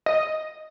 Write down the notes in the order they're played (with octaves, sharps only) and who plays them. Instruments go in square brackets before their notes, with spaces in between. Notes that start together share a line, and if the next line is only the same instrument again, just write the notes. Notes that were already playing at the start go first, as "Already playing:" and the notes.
[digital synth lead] D#5